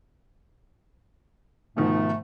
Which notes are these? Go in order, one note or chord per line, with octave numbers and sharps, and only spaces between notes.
G#2 B2 D#3 F3 A3